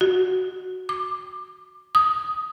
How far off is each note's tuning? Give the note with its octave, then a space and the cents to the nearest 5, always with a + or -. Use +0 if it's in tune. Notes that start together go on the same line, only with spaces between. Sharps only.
F#4 +0
D6 +20
D#6 +5